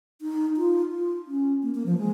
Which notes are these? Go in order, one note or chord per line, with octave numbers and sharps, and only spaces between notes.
D#4
F4
F4
C#4
A#3
A#3
F3
G#3